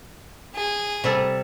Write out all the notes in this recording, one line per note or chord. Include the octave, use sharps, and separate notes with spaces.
G#4
C3 G3 A4